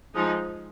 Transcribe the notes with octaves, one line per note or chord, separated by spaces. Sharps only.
F3 G#3 D#4